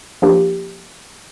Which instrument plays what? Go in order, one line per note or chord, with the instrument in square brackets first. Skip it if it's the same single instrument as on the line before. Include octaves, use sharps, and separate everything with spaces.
[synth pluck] F3 A#3 D4 G4